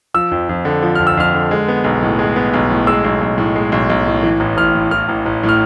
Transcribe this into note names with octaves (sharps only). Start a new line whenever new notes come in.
F3 E6
F2
F2
D3
F3
F2 F6
E6
F2 F6
D3
G#3
B3
B1
A2
G#3
B3
B1
A2
G#3 E6
B1
B1
A2
G#3
B1
B1
A2
E3
A1
A1 F6
A2
E3 F6
A1
A1
A2
F6